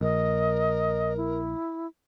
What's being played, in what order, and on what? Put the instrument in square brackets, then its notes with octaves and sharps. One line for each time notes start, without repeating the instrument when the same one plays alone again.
[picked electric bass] A#1 [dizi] A#4 [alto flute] D#5
[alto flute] E4